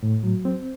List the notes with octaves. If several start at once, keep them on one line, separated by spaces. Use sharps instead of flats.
A2
F#3
C4